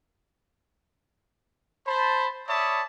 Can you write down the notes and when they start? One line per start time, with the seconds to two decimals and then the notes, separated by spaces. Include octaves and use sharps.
1.87 C5 A5 B5
2.47 C#5 D5 E5 A5 B5 D#6